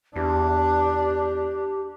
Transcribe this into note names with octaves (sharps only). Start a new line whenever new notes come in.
E2 D4 G4